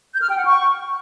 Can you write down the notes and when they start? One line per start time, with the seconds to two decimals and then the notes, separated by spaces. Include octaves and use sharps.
0.13 G6
0.21 F6
0.29 G5
0.37 F#5
0.45 C#6